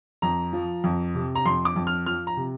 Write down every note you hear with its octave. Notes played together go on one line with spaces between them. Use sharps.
F2 A#5
F3
F2
C3
A#5
F2 C6
D6
F2
F6
F3 F6
A#5
C3